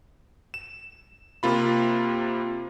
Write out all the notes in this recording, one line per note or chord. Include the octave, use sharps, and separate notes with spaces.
E7
C3 A#3 F4 B5